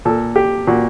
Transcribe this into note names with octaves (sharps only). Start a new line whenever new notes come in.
A#2 A4
G4
A#2 F#4